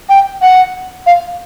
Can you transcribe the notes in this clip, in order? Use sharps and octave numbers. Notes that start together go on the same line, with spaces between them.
G5
F#5
F5